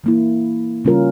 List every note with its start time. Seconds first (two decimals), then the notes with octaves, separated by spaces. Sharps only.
0.04 E3 A#3 E4
0.85 C#3 G3 C#4 F4 A#4